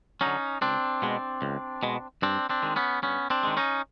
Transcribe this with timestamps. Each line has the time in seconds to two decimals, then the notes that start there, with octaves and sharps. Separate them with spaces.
0.21 D3 F#3 C#4 D#4
0.61 C#2 C4 D4
1.02 B2 G#3
1.42 C#2
1.83 B2 G#3
2.22 G2 C4 D4
2.49 C4 D4
2.62 D#3 G#3
2.76 B3 C#4
3.02 G2 B3 C#4
3.30 C4 D4
3.43 D#3 G#3
3.57 C#4 D#4